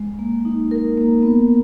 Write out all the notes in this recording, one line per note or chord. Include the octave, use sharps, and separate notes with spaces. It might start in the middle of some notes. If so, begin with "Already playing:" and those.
Already playing: G#3
A#3
D#4
A#4
A#3
B3